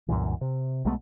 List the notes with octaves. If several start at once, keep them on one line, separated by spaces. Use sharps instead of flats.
C2 F#2 A#2 E3
C3
B1 G#3 A3 B3